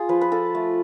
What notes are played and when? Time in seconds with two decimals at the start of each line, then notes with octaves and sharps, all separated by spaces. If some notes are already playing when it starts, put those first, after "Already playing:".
Already playing: F4 G#4
0.09 F3 B4
0.21 B4
0.32 F4 A4
0.55 A3